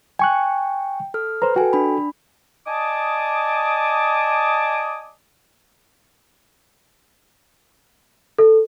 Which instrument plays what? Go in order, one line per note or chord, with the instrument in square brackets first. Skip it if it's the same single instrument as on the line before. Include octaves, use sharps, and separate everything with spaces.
[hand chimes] G5 [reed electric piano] G#5 C#6 F#6
[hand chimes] A4 F6
[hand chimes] B4 [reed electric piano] C5 A#5
[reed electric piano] F#4 A4 [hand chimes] G5 G#5
[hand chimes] D4 B5
[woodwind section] D5 D#5 G#5 A5 D6 D#6
[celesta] A4